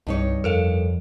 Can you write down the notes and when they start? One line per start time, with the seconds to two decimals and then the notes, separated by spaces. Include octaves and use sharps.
0.07 C2 G2 D#4 C#5
0.44 F2 A4 A#4 F5